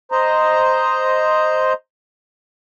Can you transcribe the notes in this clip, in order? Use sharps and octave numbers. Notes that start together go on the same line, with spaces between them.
C5 D#5 A#5